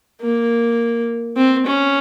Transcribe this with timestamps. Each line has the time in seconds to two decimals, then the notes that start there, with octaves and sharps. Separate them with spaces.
0.22 A#3
1.37 C4
1.67 C#4